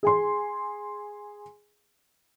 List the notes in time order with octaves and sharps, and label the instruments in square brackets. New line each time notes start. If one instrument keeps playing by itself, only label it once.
[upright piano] G#4 G#5 C6